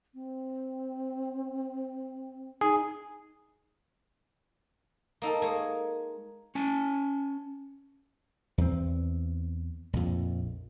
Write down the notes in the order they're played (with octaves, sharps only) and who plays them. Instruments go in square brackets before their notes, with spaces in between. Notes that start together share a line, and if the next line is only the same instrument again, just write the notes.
[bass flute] C4
[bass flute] D#4 [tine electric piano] G#4
[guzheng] A#3 D#4 A4
G#3 A#3 G#4 C#5
[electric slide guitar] C#4 G#5 A5
[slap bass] E2 C4
A#1 F2